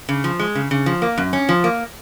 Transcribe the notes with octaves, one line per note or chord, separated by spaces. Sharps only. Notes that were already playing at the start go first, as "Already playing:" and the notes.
C#3
F3
G#3
C#3
C#3
F3
A#3
F#2
C#4
F3
A#3